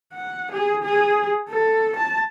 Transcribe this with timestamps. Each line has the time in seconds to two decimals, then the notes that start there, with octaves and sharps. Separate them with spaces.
0.13 F#5
0.52 G#4
0.82 G#4
1.49 A4
1.96 A5